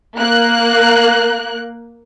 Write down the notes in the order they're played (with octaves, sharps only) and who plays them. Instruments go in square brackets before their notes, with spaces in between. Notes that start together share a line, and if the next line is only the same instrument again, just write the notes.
[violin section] A#3 F#6